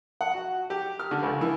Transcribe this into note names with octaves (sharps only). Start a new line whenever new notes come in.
F#5
F#4
G4
F6
D3
C#2
E3